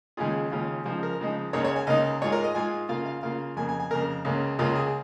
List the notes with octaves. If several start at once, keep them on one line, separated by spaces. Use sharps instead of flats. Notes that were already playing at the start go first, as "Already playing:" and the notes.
D#2 C#3 G#3 C#4 F4 G#4
D#2 C#3 G#3 C#4 F4
C#3 F3 G#3 D#4 G#4
A#4
C#3 F3 G#3 D#4
C#2 C#3 A#3 D#4 C#5
C#5
G#5
C#2 C#3 A#3 D#4 D#5
G#2 G#3 F4 C#5
A#4
D#5
G#2 G#3 F4 G#5
C#3 A#3 F4 F5
F5
C#3 A#3 F4 F5
F2 C#3 A#3 G#5
G#5
G#5
F2 C#3 A#3 A#4
C#2 C#3 A#3
C#2 C#3 A#3 F4
G#4